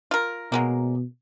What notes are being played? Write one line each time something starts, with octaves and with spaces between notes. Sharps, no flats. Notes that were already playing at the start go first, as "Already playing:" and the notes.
F4 A#4
B2 F#3 G#3 A#3